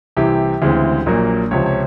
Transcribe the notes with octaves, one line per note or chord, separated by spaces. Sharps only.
C2 C3 E3 G4
D2 C#3 E3 G#3 C4
A#1 A#2 F#3 A#3
C#2 C3 F3 C#5
C#5